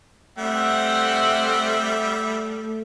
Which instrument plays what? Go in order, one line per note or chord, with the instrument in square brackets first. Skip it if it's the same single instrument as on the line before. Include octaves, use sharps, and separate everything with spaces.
[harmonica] G3 E5 [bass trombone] A3 [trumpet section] C4 F#5